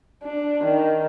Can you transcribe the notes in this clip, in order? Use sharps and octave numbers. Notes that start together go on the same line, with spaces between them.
D4
D#3